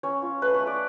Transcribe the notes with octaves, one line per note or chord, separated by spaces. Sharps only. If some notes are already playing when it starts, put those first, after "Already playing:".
C#4 C#5
F4
A3 B4
C#5
A3
D5